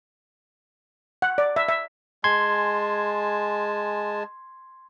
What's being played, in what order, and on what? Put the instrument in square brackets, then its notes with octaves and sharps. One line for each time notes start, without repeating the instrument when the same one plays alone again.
[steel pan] F#5
D5
E5
E5
[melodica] G#3 G#5 A5 [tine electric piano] C6 G#6